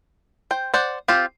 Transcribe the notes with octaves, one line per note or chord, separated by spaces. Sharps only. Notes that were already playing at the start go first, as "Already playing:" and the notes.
C5 G5
C5 D5 F#5
C4 F4 G4